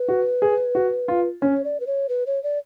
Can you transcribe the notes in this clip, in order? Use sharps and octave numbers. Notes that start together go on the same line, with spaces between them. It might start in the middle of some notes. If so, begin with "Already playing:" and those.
Already playing: B4
F#4
G#4
F#4
F4
C#4 C#5
D5
B4
C#5
B4
C#5
D5